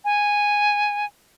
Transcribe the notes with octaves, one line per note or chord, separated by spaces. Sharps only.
G#5